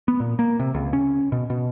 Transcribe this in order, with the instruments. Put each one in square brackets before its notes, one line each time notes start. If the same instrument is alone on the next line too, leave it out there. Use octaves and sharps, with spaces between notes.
[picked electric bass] B3
A#2
A#3
C3
C#2
C#4
B2
B2